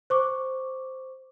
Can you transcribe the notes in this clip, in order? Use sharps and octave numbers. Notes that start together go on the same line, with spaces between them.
C5 C#6 D6